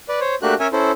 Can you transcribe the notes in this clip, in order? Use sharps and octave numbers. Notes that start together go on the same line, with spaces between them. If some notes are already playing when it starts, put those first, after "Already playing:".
B4 D5
C5 C#5
A3 A#3 D4 F#4 G4 F#6
C#4 A#4 C#5 E5 G#5
C#4 E4 A4 C5